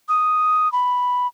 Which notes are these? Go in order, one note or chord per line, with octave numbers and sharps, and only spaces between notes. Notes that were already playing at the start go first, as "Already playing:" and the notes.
D#6
B5